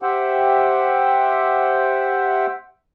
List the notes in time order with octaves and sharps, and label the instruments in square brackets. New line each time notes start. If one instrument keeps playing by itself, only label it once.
[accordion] G4 C5 E5 F#5 G5